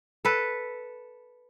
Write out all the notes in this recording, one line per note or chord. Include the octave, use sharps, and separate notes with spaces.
A4 B4